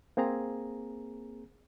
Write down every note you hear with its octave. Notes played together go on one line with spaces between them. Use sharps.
A#3 C4 G#4 A#5